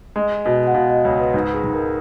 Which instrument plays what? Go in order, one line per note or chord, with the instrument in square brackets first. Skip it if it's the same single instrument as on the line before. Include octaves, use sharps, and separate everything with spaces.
[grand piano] G#3 [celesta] D#5
[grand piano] B2 [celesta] D#5
[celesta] F#5
[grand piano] B2 [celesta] F5
[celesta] D#5
[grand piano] C#2 [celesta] C#5
[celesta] B4
[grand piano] G#2 [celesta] B4
[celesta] G#4
[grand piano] G#2
[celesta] A#4